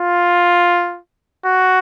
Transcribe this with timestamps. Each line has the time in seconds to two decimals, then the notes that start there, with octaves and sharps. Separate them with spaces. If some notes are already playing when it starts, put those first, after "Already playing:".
Already playing: F4
1.44 F#4